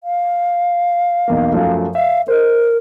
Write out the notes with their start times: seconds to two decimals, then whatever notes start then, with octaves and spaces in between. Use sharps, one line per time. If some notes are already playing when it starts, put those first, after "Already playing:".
0.04 F5
1.28 B1 E2 A#3
1.52 F#2 F3 A3
1.95 E5 F5
2.28 A#4 C5 D#5